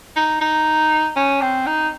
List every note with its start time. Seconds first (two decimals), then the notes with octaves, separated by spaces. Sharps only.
0.16 D#4
0.41 D#4
1.16 C#4
1.42 C4
1.67 D#4